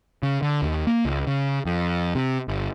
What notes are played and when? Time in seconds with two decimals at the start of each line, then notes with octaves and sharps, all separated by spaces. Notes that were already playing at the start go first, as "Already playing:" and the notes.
0.23 C#3
0.42 D3
0.62 D#2
0.87 A#3
1.05 C#2
1.27 C#3
1.66 F2
2.15 C3
2.48 G1